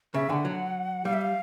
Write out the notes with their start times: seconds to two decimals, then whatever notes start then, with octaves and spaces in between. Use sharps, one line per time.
0.14 C#3 E5
0.30 D3 F#5 G#5
0.45 F#3
1.05 G3 F5
1.13 E5
1.21 F5